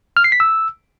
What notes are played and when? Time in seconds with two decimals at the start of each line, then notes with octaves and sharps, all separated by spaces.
0.17 F6
0.24 C7
0.32 B6
0.40 E6